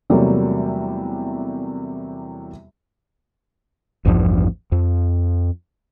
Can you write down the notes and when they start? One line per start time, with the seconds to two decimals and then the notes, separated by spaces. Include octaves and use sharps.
0.10 E2 C3 F#3 G3 A3 A#3
4.05 A1 E2 G2 F3
4.72 F2